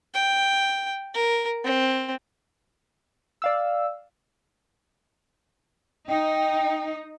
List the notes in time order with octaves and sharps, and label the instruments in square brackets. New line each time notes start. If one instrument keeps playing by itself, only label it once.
[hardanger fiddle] G5
A#4
C4
[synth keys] D5 F5 E6
[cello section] D#4 [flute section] G5